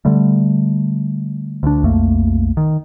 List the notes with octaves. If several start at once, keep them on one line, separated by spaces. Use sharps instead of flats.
D3 G3 A3
D2 D4
B1 F2 A3 A#3
D#3